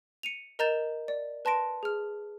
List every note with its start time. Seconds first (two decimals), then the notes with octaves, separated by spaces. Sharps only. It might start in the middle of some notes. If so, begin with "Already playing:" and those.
0.23 C#7 D#7 F7
0.59 A#4 D#5 A#5 G6 A6 E7
1.08 D5
1.45 B4 A5 C6 A#6 D7
1.83 G#4 F6